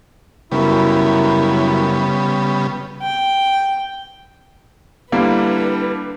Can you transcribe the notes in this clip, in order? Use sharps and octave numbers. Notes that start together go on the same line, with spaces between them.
F#2 C#3 G3 B3 E4
G5
D3 G3 A#3 D4 E4 B4